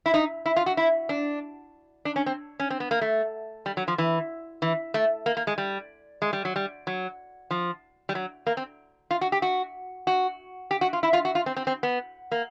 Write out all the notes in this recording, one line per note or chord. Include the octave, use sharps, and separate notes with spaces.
E4
D#4
E4
F4
F#4
E4
D4
D4
C#4
C4
C#4
C4
B3
A#3
A3
G3
F#3
F3
E3
E3
A3
A#3
A#3
G#3
G3
G#3
G3
F#3
G3
F#3
F3
G3
F#3
A#3
C4
F4
F#4
G4
F#4
F#4
G4
F#4
F4
E4
F4
F#4
F4
C4
C4
C4
B3
A#3